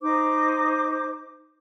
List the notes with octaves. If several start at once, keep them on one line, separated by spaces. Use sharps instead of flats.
D#4 C5 D6